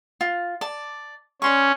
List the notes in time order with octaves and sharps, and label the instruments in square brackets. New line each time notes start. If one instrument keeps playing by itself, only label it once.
[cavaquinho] F4
D5 A5
[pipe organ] C#4 [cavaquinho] D5 C6 C#6